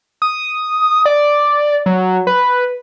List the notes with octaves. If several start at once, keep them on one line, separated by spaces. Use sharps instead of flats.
D#6
D5
F#3
B4